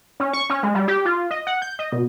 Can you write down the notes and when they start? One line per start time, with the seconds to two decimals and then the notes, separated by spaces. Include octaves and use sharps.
0.20 C#4
0.33 C#6
0.50 C#4
0.63 G#3
0.75 G3
0.88 G4
1.05 F4
1.31 D#5
1.47 F#5
1.62 G6
1.79 D#5
1.92 B2